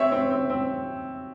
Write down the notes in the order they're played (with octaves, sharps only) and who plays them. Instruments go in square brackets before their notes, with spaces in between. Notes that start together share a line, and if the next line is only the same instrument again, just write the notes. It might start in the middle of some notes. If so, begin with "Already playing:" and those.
Already playing: [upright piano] C4 C#5 E5
C4
C4
C4